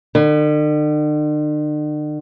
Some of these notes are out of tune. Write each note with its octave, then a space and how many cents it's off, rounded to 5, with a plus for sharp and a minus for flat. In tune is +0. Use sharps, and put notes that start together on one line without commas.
D3 +45